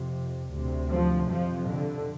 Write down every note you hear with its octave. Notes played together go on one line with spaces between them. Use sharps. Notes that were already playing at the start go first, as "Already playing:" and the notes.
Already playing: F2 C3
D2 C3
F3
F2 C3 F3
D3